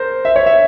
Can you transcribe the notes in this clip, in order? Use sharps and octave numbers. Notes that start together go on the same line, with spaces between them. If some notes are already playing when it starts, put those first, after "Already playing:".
Already playing: A#4 C5
E5
C#5
E5